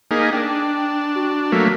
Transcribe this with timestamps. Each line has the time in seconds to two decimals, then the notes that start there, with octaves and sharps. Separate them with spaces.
0.11 A#3 D#4 G#4 B6
0.33 D4 G5
1.15 F#4
1.52 F#3 A3 A#3 B6